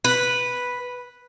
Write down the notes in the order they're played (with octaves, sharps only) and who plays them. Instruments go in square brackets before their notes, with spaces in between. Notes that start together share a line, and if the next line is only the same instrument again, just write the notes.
[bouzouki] B4